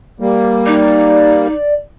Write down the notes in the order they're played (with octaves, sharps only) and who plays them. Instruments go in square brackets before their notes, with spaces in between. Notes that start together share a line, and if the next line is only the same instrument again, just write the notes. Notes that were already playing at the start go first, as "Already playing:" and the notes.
[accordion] G3 A#3
[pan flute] D#4 [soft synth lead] D5